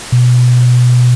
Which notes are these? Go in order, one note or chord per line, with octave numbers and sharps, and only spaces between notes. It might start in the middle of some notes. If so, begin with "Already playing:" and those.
B2